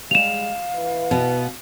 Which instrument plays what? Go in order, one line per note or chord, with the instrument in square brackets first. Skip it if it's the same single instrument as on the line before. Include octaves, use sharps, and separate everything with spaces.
[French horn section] G3 G#3 [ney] F5 [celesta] E7 F7
[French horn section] E3 B4
[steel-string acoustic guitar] B2 B3